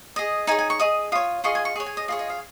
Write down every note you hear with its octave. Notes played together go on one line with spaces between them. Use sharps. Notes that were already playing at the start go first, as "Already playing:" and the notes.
G#4 D#5
D#4 G#4 C#5 G#5
G#5
C#6
G#4 D#5 D#6
F4 C#5 D#6
F4 G#4 D#5 C#6
G#5
C#6
G#4 C#5
G#5
D#5
F4 G#4 C#5 D#5
D#5
F5